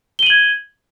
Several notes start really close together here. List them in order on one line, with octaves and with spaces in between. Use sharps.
G7 D#7 F#7 G#6